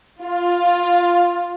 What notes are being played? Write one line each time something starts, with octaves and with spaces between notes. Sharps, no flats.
F4